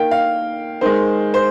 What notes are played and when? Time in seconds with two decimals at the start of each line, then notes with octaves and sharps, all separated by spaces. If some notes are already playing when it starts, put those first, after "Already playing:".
Already playing: D#3 A#3 G5
0.11 F5
0.81 D#3 G#3 C5
1.34 C5